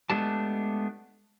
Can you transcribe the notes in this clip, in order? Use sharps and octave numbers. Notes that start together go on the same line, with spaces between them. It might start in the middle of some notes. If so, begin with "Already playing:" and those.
G#3 A3 B3 D4 G4 A5